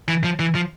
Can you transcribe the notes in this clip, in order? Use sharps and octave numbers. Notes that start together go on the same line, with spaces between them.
E3
F3
E3
F3